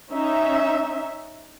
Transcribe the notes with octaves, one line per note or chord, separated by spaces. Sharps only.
C#4 D#4 E5